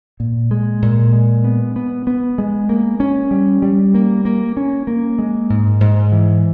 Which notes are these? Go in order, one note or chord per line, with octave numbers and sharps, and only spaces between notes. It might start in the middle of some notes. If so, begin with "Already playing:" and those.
A#2
G#3
A#2
G#3
B3
B3
B3
G#3
A#3
C#4
G3
G3
A#3
A#3
C#4
A#3
G#3
G#2
G#2
E3